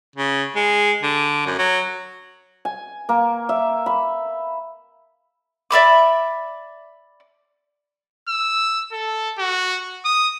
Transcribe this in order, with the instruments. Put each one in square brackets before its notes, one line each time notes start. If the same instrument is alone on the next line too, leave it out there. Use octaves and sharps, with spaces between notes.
[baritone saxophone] C#3
G#3
D3
F#2
F#3
[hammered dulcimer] G#5
A#3
E5
B5
[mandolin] D5 E5 B5 D6
[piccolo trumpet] E6
A4
F#4
D#6